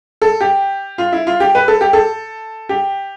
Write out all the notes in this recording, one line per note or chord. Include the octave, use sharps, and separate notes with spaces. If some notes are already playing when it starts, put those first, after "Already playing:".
A4
G4
F4
E4
F4
G4
B4
A4
G4
A4
G4